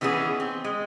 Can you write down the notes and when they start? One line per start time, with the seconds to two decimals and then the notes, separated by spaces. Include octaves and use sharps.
0.01 D#3 E3 B3 C#4 G#4
0.40 C4
0.64 G#3